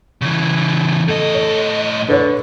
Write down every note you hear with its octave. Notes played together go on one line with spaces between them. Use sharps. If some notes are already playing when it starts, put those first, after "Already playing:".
C#3 E3
A2 A4 D#5
C#5
D3 B4 C#5